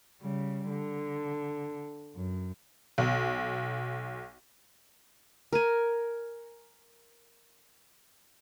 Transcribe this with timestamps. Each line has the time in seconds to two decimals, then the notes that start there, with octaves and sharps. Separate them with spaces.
0.21 C#3 G3
0.68 D3
2.16 F#2
2.98 B1
5.53 A#4 G#5